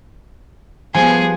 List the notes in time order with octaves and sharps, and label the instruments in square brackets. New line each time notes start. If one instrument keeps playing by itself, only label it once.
[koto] F3 [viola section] G3 B3 [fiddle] G#4 [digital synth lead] G#5